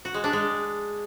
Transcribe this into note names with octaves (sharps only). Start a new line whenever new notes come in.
F#4
G#3
D4
G#3